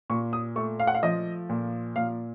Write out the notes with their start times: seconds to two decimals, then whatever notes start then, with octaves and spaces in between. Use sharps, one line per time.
0.10 A#2 C#6
0.33 D#6
0.56 A3 C#6
0.80 F5
0.87 F#5
0.94 F5
1.03 F3 D#5
1.50 A#2
1.96 A#2 F5